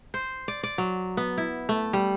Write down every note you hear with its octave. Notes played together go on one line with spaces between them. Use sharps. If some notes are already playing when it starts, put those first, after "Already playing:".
C5
D5
D5
F#3
B3
E4
A3
G3